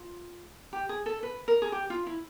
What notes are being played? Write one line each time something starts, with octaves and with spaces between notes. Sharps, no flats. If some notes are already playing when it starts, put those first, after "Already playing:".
Already playing: F4
G4
G#4
A4
B4
A#4
G#4
G4
F4
E4